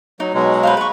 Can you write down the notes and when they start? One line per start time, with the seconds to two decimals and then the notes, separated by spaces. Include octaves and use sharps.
0.20 F#3 D#4
0.34 B2 F#3 G#3
0.63 B4 C5 F5
0.77 B4 C#6